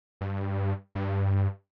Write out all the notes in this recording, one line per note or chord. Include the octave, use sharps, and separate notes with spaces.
G2
G2